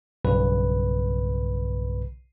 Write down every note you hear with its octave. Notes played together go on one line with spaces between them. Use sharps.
B1 G2 C#3 B4